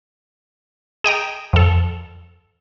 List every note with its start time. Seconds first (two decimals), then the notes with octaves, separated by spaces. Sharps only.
1.04 G#4 D#5 G5 A#5
1.53 F2 A4